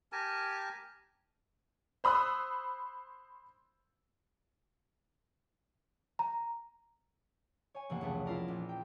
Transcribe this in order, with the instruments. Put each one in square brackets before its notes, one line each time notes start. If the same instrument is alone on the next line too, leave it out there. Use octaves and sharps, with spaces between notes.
[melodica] G4 A#4 G#5 A5
[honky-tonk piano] C5 B5 D#6 E6 F#6
[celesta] A#5
[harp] C#5 G#5
F1 E3 A#3 F#5
F1 C#2 A3 B3
E4 F4 A#4 D5
A#1
G5